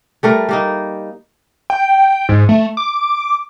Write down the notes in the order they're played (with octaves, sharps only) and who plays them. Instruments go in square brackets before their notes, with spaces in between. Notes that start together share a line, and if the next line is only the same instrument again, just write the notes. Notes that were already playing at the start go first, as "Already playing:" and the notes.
[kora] G3 A3 A#4
G3 A#3 D#4
[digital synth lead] G5
G#2
A3
D6